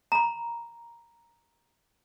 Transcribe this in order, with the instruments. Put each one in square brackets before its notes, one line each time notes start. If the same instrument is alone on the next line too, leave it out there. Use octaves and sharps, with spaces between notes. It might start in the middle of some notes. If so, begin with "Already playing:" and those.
[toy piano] A#5 B5